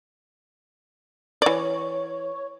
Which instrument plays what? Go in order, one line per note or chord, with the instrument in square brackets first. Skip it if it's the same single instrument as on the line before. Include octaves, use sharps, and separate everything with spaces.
[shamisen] E3 D5 [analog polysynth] C#5